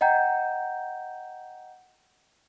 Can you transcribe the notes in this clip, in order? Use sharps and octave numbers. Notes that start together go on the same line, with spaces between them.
D#5 F#5 G5 A#5 G6